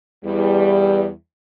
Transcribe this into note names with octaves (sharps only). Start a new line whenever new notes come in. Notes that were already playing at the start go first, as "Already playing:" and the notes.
E2 G3